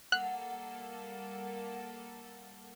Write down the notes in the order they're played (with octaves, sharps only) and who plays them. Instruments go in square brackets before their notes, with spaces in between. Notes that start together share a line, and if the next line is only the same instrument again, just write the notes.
[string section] G3 A#3 A4 [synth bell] F#5 [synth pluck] F#6